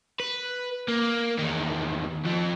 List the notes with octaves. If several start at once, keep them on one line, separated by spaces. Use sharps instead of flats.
B4
A#3
E2 D#3
F2 F3